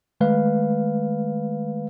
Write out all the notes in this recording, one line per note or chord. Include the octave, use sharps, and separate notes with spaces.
D#3 G#3 A3 B4 F5